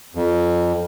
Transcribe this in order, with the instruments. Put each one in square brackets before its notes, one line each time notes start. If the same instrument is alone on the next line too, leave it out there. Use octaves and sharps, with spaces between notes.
[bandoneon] F2